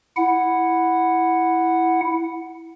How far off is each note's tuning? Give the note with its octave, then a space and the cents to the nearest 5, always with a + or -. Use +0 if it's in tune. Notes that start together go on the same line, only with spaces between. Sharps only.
E4 +0 F#5 +0